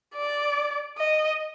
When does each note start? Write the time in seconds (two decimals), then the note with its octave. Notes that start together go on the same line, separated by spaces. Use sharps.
0.14 D5
0.98 D#5